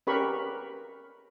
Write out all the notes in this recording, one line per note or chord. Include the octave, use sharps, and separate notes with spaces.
C#4 G4 A#4 B4 B5 C#6